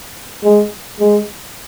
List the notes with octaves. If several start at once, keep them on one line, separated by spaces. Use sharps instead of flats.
G#3
G#3